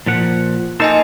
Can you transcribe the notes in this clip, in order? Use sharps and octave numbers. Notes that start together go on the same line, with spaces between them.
A#2 F3 F#5
A#3 D#4 A4 C5 D#5 G#5